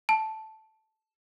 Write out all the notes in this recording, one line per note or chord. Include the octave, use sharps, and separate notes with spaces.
A5